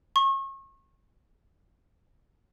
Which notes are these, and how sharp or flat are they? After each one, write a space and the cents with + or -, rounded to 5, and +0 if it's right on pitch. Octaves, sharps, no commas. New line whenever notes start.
C#6 -35